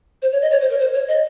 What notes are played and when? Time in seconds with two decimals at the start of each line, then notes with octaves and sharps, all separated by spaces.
0.22 C5
0.32 C#5
0.42 D#5
0.51 C#5
0.61 C5
0.70 A#4
0.79 C5
0.93 C#5
1.08 D#5